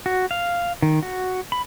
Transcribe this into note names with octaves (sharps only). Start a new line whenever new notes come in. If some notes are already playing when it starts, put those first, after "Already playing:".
F#4
F5
D#3
F#4
B5